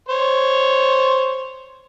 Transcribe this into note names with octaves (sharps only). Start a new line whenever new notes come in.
C5 C#5